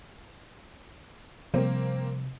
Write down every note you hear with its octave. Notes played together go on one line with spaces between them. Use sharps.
C3 F3 G3 A#3 C4